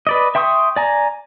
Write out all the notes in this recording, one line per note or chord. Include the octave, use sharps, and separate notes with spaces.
B4 D5 D#5
E5 G5 C6 C#6 D#6
D5 G#5 A#5